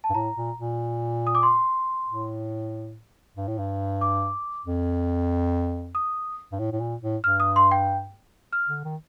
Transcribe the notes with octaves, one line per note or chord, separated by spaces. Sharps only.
A5
G2
A2 A#5
A#2
A#2
D#6
D6
C6
A2
G2
A2
G2
D6
F2
D#6
G2
A2
A2
A#2
A2
G2 F6
D#6
C6
G5
F6
D3
D#3